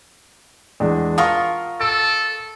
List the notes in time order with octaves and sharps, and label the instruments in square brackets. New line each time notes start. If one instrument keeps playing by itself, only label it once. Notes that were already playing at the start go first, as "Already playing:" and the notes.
[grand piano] E2 G#3 D4
[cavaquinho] F4 A#4 C#6 [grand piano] F#5 A5 D#6
[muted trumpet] A4 [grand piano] A6 D7